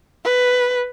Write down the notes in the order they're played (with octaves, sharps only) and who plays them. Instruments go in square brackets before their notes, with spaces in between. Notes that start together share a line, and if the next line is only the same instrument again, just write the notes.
[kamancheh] B4